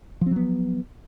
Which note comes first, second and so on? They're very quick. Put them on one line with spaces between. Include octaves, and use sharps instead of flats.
F3 C4 F#3 B3